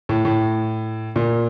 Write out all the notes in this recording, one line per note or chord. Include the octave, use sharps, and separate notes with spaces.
A2
A2
A#2